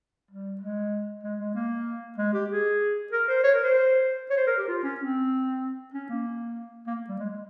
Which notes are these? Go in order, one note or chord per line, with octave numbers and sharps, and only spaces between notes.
G3
G#3
G#3
G#3
A#3
G#3
G4
G#4
A#4
C5
C#5
A#4
C5
C#5
C5
A#4
G4
F4
C#4
C4
C#4
A#3
A#3
G3
G#3
G#3